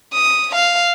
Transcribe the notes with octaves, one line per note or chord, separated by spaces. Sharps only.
D#6
F5